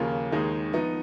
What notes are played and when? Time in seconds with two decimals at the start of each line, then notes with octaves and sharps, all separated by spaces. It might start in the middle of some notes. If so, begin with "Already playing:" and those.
Already playing: D#2 C#3 F3 A#3 F4
0.32 D#2 D#3 G#3 D#4 G#4
0.73 F3 B3 D#4